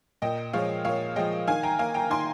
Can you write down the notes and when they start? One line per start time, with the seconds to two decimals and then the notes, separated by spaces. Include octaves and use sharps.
0.22 A#2 D#5 G5
0.53 F3 G#3 C#5 F5
0.85 A#2 C#5 F5
1.16 F3 G#3 D#5 G5
1.47 D#3 F5 G#5
1.63 G5 A#5
1.79 A#3 F5 G#5
1.94 G5 A#5
2.10 D#3 G#5 C6